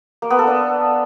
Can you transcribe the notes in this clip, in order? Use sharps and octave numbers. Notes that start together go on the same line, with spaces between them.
A#3
B3
A4
D4